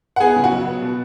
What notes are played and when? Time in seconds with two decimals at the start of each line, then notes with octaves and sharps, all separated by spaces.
0.16 F#5
0.20 B3 G#4 G#5
0.36 C#3
0.44 F#4 F#5
0.51 F#3
0.67 B3
0.82 B2